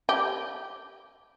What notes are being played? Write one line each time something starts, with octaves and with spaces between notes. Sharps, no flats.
G4